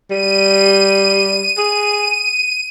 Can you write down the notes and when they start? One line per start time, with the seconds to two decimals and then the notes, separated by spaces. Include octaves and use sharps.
0.10 G3 D#7
1.57 G#4